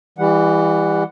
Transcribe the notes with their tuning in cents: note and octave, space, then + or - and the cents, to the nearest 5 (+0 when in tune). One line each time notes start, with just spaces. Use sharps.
E3 +0 G3 +30 F#5 +0